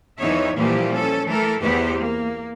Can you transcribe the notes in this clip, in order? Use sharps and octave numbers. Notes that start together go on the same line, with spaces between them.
E2 E3 F3 D#4 C#5 E5
A#2 E3 F3 G3 A#3 G4
C#4 A4
E3 A3 A4 A#4
E2 E3 B3 G4 C5
A#3